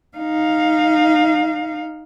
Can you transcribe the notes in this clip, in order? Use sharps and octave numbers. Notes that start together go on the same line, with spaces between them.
D#4 F5